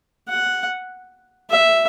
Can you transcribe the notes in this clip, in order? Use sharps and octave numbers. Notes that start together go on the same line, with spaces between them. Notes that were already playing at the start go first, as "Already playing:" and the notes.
F#5
E5